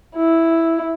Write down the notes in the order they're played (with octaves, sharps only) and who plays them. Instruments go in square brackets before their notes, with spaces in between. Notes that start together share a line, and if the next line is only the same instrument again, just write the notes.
[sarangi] E4